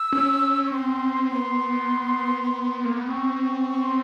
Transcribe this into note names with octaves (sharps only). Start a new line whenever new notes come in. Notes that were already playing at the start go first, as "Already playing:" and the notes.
Already playing: E6
C#4
C#6
C4 C6
B3 C6
A#3
B3
C4 C#6
C#6
C6